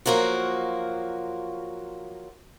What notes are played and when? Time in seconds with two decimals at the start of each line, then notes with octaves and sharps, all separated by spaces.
0.06 F3 F#3 A#3 F4 F#4